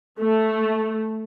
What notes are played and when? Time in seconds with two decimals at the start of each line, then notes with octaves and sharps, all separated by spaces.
0.20 A3